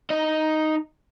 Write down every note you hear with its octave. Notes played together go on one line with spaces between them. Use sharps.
D#4 D#5